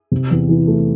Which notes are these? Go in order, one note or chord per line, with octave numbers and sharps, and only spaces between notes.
C3
E2
E3
A3